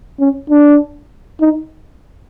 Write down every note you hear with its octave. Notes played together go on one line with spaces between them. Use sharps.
C#4
D4
D#4